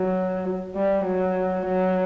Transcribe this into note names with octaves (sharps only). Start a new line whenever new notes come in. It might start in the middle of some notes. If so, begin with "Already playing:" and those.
Already playing: F#3
G3
F#3
F#3